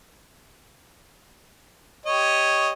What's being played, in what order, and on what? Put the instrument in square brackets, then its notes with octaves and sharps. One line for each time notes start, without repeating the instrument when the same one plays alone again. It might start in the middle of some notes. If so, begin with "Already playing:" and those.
[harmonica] G4 C#5 D#5